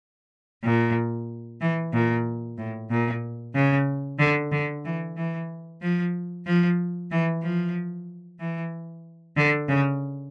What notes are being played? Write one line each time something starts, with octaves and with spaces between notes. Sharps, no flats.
A#2
E3
A#2
A2
A#2
C#3
D3
D3
E3
E3
F3
F3
E3
F3
E3
D3
C#3